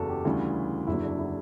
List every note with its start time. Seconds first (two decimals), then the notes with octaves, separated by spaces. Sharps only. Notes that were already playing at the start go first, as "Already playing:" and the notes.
Already playing: F#1 E2 C#3 F#4 A4
0.09 G4
0.25 D2 C#3 E3 G3 F#4
0.87 F#1 E2 D3 F#3 E4
1.03 D4
1.19 E4